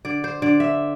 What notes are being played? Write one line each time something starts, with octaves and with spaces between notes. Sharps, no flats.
D3 D5
C5
D3 D5
E5